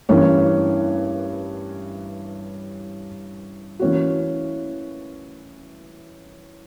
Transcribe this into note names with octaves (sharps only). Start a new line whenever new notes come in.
G2 E3 A#3 C#4
E3 A#3 C#4 F#4